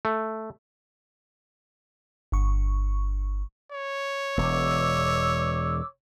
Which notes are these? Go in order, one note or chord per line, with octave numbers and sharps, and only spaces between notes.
A3
G1 C#6
C#5
E1 E2 D6 E6